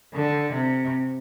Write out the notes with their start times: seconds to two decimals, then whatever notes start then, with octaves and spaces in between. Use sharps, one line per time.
0.14 D3
0.53 C3